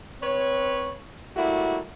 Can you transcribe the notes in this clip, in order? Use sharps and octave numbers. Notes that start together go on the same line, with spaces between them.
C4 B4 C#5
G3 A3 A#3 E4 F#4